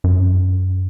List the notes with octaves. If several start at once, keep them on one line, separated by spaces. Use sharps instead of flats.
F#2